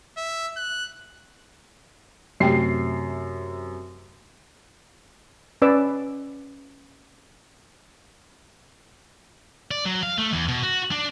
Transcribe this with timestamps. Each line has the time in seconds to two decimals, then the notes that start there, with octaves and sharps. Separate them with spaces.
0.17 E5
0.56 F#6
2.40 F#2 C3 A3 G4 G5 C7
5.62 C#4 B4 D5 D6 E6
9.71 D5
9.85 F#3
10.03 F5
10.18 A3
10.33 E2
10.48 B2
10.63 F#4
10.91 D4